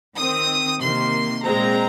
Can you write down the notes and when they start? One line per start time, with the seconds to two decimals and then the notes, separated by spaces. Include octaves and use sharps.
0.16 D#3 C4 D#6
0.80 C3 D#3 A#3 C6
1.43 A#2 G#3 C4 A#5